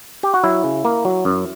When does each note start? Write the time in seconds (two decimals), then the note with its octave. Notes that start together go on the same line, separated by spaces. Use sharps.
0.23 G4
0.34 F#4
0.44 F#3 E4
0.64 C#3
0.85 A#3
1.05 F#3
1.25 F#2